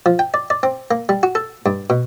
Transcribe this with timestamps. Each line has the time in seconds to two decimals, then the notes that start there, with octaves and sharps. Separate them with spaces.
0.06 F3
0.19 G5
0.34 D5
0.50 D5
0.63 C4
0.91 A#3
1.09 G3
1.23 F#4
1.35 A4
1.66 G2
1.90 B2